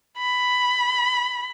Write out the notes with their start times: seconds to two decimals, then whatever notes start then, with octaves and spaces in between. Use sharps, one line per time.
0.18 B5